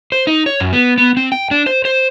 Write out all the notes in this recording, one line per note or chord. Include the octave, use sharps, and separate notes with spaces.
C5
D#4
C#5
F#2
B3
B3
C4
G5
D4
C5
C5